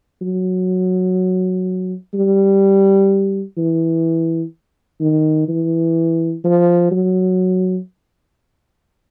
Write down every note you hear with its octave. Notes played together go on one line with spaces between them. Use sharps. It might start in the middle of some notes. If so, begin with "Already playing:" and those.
F#3
G3
E3
D#3
E3
F3
F#3